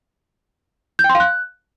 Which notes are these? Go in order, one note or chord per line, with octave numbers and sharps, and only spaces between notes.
G6
G5
C6
F5
F#6